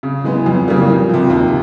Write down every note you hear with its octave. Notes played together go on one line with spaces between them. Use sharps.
C#3
E3 G#3 B3
F2
C#3 E3 G3 A#3
F2
C3 F3
D#2